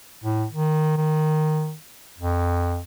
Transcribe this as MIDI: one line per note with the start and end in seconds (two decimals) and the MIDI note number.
0.24 0.46 45
0.52 0.94 51
0.97 1.74 51
2.18 2.80 41